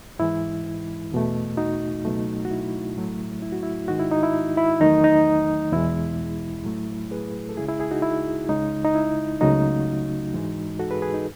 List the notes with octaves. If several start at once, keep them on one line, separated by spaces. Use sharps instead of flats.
G#2 E3 G#3 E4
E2 B2 A3
D#4 F#4
C#2 B2 F#3 A3
F#4
E4
A2 F#3 A3
E4
F#4
E4
G#2 D#3 G#3 D#4 F#4
E4
D#4
E4
E4
E2 D#3 F#3 A3 D#4
D#4
E2 B2 G#3 E4
A2 F#3 A3
G#4 B4
A4
C#2 C#3 G#3 E4 G#4
E4 G#4
E4 G#4
D#4 F#4
E4
C#2 C#3 G#3 D#4
D#4
E4
C#2 C#3 F#3 A3 D#4 F#4
G#2 E3 G#3
F#4 A4
G#4 B4
G#4 B4
D#4